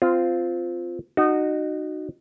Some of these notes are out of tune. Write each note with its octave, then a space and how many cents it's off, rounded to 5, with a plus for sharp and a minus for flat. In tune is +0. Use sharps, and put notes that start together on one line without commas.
C4 -15 F4 +0
D#4 -25 F#4 +0